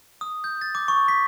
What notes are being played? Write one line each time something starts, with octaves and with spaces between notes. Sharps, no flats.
D#6
G6
A6
D6
C#6
B6